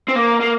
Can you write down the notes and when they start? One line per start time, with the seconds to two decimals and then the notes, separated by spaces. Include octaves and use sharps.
0.09 C4
0.16 A#3
0.41 A#3